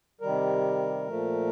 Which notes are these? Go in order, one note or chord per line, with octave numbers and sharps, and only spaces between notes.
C3 D#3 G3 A#4
A#2 F3 A3